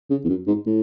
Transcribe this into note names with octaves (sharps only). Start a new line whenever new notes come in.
C#3
E2
F#2
G#2
A2